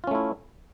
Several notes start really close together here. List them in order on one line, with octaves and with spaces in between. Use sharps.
F4 C#4 A3 E4